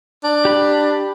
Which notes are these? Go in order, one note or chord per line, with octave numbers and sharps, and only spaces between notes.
D4
G4 B5